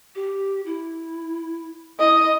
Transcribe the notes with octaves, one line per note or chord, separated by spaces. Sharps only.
G4
E4
E4 D#5